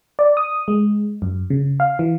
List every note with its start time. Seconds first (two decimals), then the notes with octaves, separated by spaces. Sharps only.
0.19 D5
0.37 D#6
0.68 G#3
1.22 F#2
1.50 C#3
1.80 F5
1.99 E3